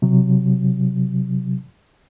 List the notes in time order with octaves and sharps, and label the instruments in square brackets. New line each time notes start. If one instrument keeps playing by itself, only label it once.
[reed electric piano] C3 F#3